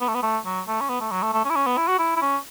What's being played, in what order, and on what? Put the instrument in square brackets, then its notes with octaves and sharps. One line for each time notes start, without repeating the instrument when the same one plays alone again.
[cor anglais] B3
A3
B3
A3
F#3
A3
C#4
B3
A3
F#3
A3
A3
C#4
E4
C#4
B3
E4
F#4
E4
E4
C#4